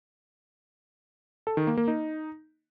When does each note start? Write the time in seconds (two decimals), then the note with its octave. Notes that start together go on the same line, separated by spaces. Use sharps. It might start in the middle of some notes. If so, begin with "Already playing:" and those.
1.47 A4
1.57 D#3
1.67 A#3
1.77 A#3
1.88 D#4